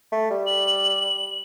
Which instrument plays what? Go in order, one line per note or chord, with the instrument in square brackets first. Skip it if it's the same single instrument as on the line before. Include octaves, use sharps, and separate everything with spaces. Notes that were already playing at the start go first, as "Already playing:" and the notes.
[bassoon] A3
G3
[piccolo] F#7